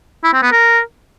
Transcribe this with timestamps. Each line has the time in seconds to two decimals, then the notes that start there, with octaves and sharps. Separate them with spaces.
0.24 E4
0.33 C4
0.43 B3
0.52 A#4